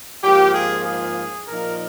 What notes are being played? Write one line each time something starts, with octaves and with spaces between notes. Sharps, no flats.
G#2 F3 A#3 F4 G4
G#4
G#4
A#2 F3 A#3 D#4 A#4